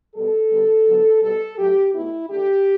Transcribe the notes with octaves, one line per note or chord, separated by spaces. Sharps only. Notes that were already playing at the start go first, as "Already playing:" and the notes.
B2 G3 B3 A4
D3 G3 B3
D3 F#3 B3
B2 G3 B3 A4
A2 F#3 A3 G4
B2 A3 E4
D3 A3 G4